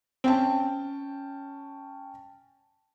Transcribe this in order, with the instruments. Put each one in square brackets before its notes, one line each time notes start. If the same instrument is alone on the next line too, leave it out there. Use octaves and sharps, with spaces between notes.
[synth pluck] C4 [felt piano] C#4 G5 A5